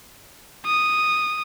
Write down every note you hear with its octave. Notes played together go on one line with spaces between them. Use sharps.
D#6